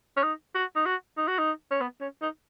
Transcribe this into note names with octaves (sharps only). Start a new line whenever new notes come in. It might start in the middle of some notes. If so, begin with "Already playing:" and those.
C#4
D#4
F#4
D#4
F#4
D#4
F#4
D#4
C#4
B3
C#4
D#4